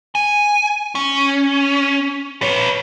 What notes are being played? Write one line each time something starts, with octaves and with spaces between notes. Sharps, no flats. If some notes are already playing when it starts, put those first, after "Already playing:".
G#5
C#4
B4 C#5